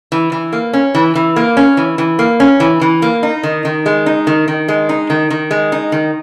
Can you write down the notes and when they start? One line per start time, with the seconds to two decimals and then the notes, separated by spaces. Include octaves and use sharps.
0.12 E3
0.32 E3
0.53 A#3
0.73 C#4
0.95 E3
1.15 E3
1.36 A#3
1.57 C#4
1.77 E3
1.98 E3
2.19 A#3
2.40 C#4
2.60 E3
2.81 E3
3.02 A#3
3.23 D#4
3.43 D#3
3.65 D#3
3.86 G#3
4.06 D#4
4.27 D#3
4.48 D#3
4.68 G#3
4.89 D#4
5.10 D#3
5.30 D#3
5.51 G#3
5.72 D#4
5.92 D#3